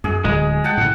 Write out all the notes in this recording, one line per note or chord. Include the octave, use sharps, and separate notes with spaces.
F#2 G#4
D1 G#3
F#5 G5 A5
A2 C#3